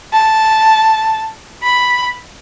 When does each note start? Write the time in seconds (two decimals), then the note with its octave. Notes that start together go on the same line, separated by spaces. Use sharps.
0.13 A5
1.63 B5